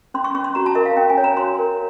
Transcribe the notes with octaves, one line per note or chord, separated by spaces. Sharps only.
C#4 C6
C#6
C#4 C#6
C6
F#4 A#5
A5
A#4 E5
F5
C#4 G5
G#5
C#5
A#5
F#4 C6
A#4